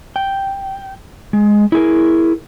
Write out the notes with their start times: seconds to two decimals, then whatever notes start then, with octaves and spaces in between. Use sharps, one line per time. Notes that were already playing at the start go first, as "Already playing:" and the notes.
0.16 G5
1.33 G#3
1.72 E4 G#4 A#4